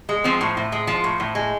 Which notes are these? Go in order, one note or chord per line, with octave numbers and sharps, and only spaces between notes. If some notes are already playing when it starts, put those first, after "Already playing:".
G#3
F3 C4
A2
A2
G#3
F3
A2
A2
G#3